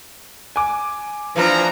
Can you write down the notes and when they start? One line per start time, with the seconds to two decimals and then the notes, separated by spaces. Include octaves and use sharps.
0.56 G#5 D6
1.36 E3 F3 A#3 D4 A#5